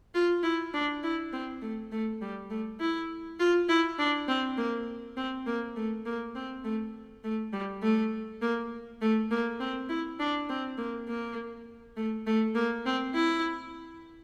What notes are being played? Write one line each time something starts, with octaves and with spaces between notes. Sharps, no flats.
F4
E4
D4
E4
C4
A3
A3
G3
A3
E4
F4
E4
D4
C4
A#3
C4
A#3
A3
A#3
C4
A3
A3
G3
A3
A#3
A3
A#3
C4
E4
D4
C4
A#3
A#3
A3
A3
A#3
C4
E4